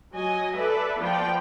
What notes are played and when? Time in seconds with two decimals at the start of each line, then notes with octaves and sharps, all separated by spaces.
0.14 F#3 D#5 G#5
0.55 A4 B4 D5 E5
0.99 F3 B3 F4 D5 G5